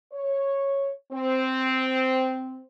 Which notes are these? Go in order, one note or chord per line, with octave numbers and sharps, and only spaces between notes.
C#5
C4